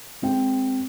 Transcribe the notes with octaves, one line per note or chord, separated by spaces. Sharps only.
G#3 C4 G5